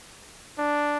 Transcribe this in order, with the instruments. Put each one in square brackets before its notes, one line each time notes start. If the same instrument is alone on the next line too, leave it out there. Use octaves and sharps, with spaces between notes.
[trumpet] D4